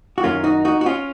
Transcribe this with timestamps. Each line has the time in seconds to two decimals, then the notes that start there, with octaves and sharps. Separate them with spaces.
0.18 F#4
0.23 F#2 D#3 A#3 C#4 F4
0.44 D#4 F#4
0.65 D#4 F#4
0.81 F#4
0.86 C#4 F4